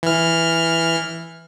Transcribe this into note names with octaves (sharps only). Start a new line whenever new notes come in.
E3 F6